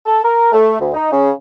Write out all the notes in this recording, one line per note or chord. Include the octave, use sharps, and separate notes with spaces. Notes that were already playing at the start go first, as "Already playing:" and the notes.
A4
A#4
A3
D2
D#4
C#3